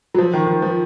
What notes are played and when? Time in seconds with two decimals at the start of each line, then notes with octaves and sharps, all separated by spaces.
0.14 F#3
0.19 F3
0.33 D#3
0.47 D#3
0.62 F3